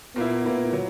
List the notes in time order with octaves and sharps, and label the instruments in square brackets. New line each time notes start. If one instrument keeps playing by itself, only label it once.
[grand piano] A#2 A#3 E4 [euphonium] B3
[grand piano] A#2 A#3 E4
F#3